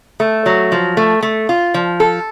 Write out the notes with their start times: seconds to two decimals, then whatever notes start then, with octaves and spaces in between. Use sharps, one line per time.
0.20 A3
0.46 F#3
0.72 F3
0.97 A3
1.23 A3
1.49 F4
1.74 F3
2.00 A4